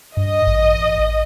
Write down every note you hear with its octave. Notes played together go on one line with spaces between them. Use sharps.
G2 D#5
A1